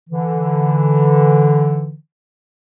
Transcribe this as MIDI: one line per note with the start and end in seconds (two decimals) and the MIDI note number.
0.10 1.97 50
0.10 1.97 52